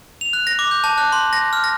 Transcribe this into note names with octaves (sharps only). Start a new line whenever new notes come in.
F7
F#6
A#6
D6
G6
A5
F#6
C6
A#6
F6
A#6